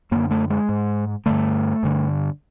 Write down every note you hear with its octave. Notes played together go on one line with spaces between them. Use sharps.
F#2 D3 A#3
A3
G#3
G#2
G2 D3 A3
G2 D3